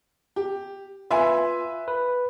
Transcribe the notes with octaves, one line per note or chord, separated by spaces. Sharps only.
G4
F4 B4 E5 G#5
B4